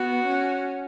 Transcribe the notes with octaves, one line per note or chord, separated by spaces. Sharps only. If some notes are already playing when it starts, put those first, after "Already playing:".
Already playing: B3 F#4
C#4